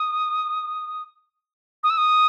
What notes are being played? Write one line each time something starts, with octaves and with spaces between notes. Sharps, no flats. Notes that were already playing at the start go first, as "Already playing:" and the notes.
Already playing: D#6
D#6
E6
D#6